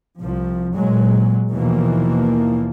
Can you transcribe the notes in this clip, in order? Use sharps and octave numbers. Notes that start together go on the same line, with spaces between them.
C2 F3
A#2 F#3 G#3
D#2 B2 E3 F3 A#3